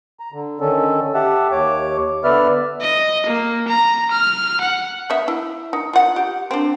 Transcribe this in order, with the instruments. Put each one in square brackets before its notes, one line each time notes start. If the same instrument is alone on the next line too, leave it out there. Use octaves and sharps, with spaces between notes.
[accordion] A#5
D3
D3 D#3 C#4 A4
G4 E5 F#5 A5
D#2 C#5 D6
D3 B3 B4 D5 E5 F6
[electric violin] D#5
A#3
A#5
F6
F#5
[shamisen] B3 E5 F5
E4
D#4
F4 F#5
G4
C4 D4